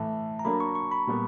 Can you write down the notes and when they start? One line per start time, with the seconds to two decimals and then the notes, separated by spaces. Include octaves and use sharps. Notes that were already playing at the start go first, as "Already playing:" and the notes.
Already playing: A2 E3 A3 A5
0.39 A#5
0.45 F#3 A#3 D4 B5
0.60 C#6
0.75 C#6
0.91 B5
1.07 A#2 G3 B3